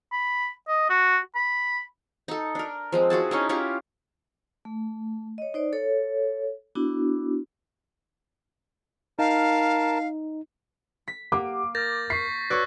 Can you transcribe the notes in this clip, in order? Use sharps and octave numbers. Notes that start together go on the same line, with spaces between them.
B5
D#5
F#4
B5
D#4 A4
D4 A#4
F3 G#3 C4
E4 F#4 G#4 A5
C#4 D#4 E4
C#4 E4 F4 G4
A3
C#5 D#5
D#4 C5 D5
A4 C#5
B3 D4 E4 F#4
D#4 A#4 F5 A5
B6
A#3 G4 F#5 D6
A#4 F6 G6 A6 A#6
C#6 B6 C7
F#4 B4 C#5 D5 E6 F#6